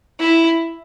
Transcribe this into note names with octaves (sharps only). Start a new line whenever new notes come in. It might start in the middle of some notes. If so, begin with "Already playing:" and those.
E4